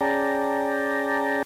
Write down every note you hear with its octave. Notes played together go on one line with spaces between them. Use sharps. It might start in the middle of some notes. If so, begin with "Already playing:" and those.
C#4 G#4 D5 G5 A5 A#5